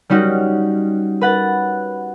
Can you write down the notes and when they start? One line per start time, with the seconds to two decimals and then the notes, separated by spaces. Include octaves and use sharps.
0.10 G3 C#4 D#4 F#4
1.21 B4 F#5 A6